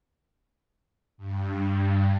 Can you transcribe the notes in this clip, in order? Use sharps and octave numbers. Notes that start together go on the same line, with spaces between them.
G2